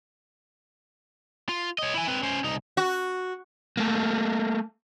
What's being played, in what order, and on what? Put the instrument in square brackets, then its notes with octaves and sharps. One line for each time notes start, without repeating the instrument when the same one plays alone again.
[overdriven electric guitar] F4
C#5 D#5
E4 G#5
C4 B4
C#4 C5
C2 D#4
[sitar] F#4
[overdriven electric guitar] A3 A#3